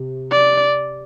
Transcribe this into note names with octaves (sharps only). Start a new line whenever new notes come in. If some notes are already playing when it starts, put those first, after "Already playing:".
Already playing: C3
D5